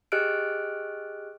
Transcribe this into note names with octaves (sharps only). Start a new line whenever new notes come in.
G4 G#4 D#5 F6 F#6 D7